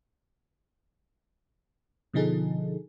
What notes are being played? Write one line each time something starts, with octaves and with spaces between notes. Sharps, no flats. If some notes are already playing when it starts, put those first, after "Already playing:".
B2 D3 F3 D#4 G#4 A4